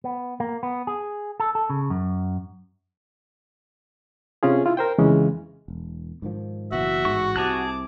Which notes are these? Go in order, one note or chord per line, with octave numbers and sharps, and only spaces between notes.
B3
A#3
B3
G#4
A4
A4
C#3
F#2
C3 C#4 F4 G#4
E4 F4
A#4 C5 G5
F2 C#3 E3 G#3 C#4
E1
G#2 D#3 F3
F#1 B2 E3 F#4 E5
A1 G#2 C#6
C2 C3 G#4 A5 D6 F#6